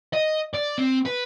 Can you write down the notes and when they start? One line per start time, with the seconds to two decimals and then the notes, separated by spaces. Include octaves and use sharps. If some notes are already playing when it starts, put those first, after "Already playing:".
0.13 D#5
0.55 D5
0.78 C4
1.06 B4